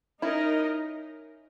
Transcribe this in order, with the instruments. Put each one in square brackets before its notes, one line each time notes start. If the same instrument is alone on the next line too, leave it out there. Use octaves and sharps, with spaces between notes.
[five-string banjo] C#4 E4 [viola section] D#4 A#4 D#5